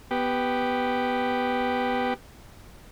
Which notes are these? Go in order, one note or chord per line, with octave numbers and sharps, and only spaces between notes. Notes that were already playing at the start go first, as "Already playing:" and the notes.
B3 G4